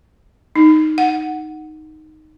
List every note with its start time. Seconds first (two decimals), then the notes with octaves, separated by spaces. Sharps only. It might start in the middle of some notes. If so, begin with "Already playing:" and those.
0.56 D#4
0.98 F#5